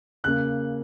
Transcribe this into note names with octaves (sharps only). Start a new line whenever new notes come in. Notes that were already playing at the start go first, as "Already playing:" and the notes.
C#3 A#3 F#6